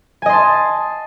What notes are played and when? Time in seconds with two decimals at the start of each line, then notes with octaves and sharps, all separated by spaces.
0.22 G#5
0.26 D#5
0.29 C6
0.33 A5